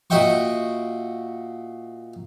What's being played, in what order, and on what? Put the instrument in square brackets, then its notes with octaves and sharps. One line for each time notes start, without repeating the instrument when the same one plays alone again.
[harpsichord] A#2 F#4 D#5 E5 G5 C#6